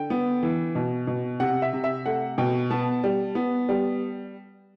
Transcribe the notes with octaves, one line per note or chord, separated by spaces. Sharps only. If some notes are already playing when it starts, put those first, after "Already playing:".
Already playing: D3 G5
B3
E3
B2
B2
C3 F#5
E5
C3
E5
A3 F#5
B2 G5
B3 A5
G3
B3
G3